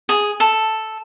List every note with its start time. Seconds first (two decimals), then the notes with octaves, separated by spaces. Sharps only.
0.09 G#4
0.40 A4